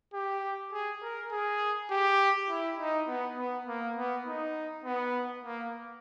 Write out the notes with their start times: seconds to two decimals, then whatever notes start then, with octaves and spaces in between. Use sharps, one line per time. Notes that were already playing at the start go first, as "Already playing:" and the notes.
0.14 G4
0.72 G#4
1.03 A#4
1.32 G#4
1.91 G4
2.49 E4
2.79 D#4
3.08 B3
3.38 B3
3.67 A#3
3.96 B3
4.26 D#4
4.84 B3
5.44 A#3